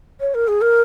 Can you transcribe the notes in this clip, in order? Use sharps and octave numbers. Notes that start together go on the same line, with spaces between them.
C#5
A#4
G#4
A#4